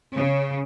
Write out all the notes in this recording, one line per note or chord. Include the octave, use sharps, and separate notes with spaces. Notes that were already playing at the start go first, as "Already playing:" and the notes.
C#3